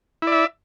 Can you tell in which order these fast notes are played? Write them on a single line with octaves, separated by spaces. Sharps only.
E4 D5 E5